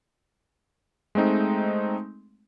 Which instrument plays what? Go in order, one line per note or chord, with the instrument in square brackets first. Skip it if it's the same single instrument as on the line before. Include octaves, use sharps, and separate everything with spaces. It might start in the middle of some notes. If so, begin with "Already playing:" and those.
[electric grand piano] G#3 A3 C4 D#4